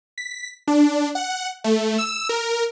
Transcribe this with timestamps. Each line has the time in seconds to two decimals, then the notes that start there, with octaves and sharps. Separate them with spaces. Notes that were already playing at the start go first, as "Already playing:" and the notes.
0.18 B6
0.68 D4
1.15 F#5
1.64 A3
1.98 E6
2.29 A#4